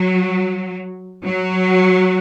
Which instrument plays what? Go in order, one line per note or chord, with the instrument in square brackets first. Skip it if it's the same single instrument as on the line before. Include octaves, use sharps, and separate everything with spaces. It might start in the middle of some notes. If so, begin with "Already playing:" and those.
Already playing: [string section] F#3
F#3